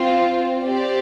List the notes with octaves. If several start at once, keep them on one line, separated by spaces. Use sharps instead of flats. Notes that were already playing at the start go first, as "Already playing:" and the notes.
Already playing: C4 F4
C4 G4 D5